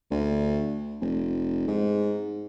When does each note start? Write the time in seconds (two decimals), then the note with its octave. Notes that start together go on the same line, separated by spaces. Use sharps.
0.11 D2
1.01 F1
1.68 G#2